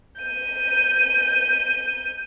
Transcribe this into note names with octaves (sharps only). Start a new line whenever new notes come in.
G6 D#7